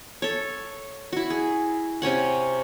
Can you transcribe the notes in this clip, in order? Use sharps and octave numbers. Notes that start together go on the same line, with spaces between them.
A4 C#5
E4 F#4
G#4
C3 C#4 C#5 F#5